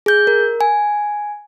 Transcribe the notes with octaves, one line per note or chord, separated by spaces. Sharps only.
G#4 G6
A#4
G#5